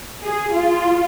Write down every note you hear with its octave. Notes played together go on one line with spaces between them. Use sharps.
G#4
F4